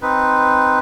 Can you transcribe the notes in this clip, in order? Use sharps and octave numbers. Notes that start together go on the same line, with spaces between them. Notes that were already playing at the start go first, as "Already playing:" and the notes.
C4 D#4 B4